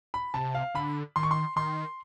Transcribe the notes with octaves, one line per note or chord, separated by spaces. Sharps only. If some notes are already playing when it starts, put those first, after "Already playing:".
B5
C3 A5
F5
D3 B5
D#3 C6
C#6
C6
D#3 C6